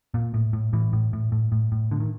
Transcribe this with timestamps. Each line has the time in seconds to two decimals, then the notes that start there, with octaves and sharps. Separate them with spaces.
0.14 A#2
0.34 A2
0.53 A2
0.73 A2 E3
0.93 A2
1.13 A2
1.32 A2
1.52 A2
1.72 A2
1.91 A2 D3
2.00 D#3